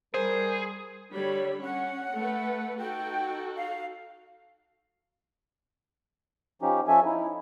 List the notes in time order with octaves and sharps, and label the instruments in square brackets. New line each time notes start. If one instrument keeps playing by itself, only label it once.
[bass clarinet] G3 [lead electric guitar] G#4 [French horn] A#4 [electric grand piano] C5
[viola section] D3 G3 B5 [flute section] C#5
[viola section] C#4 [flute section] F#5
[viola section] A3 B4
[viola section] D#4 F#4 A4 [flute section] G5
[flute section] F5
[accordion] F3 C#4 D#4 G4
F3 C#4 A4 E5 G#5
D#4 E4